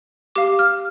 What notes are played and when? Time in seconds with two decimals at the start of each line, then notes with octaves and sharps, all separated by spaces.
0.36 G4 F5 D6
0.59 F6